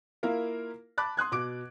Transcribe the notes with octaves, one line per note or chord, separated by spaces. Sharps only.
A#3 E4 F4 A#4 F5
A5 B5 D6 F#6 A6
C6 D#6 F#6 G#6
B2 D6 D7